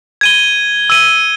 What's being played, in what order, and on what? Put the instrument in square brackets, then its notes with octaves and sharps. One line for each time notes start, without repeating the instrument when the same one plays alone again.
[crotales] G#6 D#7 G7
E6 D#7 G7